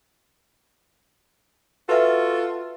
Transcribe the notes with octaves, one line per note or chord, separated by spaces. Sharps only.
F4 F#4 A4 B4 E5 F#5